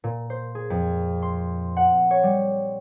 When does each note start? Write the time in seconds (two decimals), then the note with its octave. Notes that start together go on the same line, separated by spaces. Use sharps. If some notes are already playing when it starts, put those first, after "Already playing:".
0.04 A#2
0.30 C5
0.55 G#4
0.70 F2
1.22 C6
1.77 F#5
2.11 C#5
2.23 G3